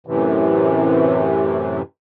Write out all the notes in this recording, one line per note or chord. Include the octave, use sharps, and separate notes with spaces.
F#2 A2 C3 E3